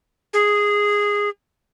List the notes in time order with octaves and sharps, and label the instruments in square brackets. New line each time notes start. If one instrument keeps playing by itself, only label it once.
[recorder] G#4